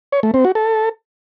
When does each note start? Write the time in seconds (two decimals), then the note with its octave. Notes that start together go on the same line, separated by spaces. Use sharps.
0.12 C#5
0.23 A3
0.34 C4
0.45 F#4
0.55 A4